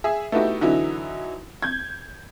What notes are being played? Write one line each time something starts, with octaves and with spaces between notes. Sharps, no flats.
G#4 E5
A3 B3 D#4 E4 F#4 G4
D3 E3 F#3 D#4 E4
G6 G#6